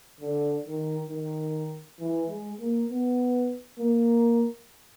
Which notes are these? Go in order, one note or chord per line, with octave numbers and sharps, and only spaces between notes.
D3
D#3
D#3
E3
G#3
A#3
B3
A#3